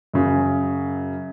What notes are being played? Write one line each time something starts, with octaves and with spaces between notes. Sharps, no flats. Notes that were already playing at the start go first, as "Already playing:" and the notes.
F#2 C#3